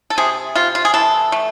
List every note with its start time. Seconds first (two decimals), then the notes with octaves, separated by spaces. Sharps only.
0.10 A4
0.18 C3 G#4
0.56 C3 F4
0.75 F4
0.85 G#4
0.94 E3 A4
1.32 A3